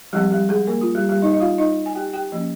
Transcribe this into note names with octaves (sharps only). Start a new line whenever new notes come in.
F3 G3 G#3 C4 G4
G3 G4
G#3 G#4
A#3 A#4
F4
G3 G4
G3 G4
D#4 D#5
D#5
F4 F5
D#4 D#5
G#5
G4 G5
G4 G5
F3 A#3 C#4